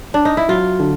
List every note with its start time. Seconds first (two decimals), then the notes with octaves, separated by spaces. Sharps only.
0.14 D4
0.25 D#4
0.37 E4
0.49 F#3 F4
0.80 D3